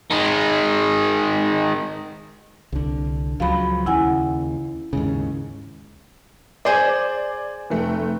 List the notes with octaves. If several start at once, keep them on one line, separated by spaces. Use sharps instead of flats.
D#3 G#3
C2 D3
C#2 F3 F#3 F5 B5
D#2 C#3 E4 F#5 G#5
D#2 G#2 C#3
G#4 C5 D5 G#5
F1 A3